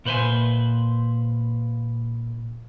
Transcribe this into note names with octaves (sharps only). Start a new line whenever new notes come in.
A#2 B4 C5 E5 G#5